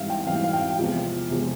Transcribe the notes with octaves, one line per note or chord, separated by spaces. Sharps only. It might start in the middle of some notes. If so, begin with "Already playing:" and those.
Already playing: G#2 E3 G3 E5 F5
G5
G#2 E3 G3 F5
F5
G5
F5
E2 C3 F3 G#3
E2 C3 F3 G#3